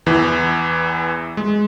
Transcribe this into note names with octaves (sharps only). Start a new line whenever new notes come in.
E2 E3
G#3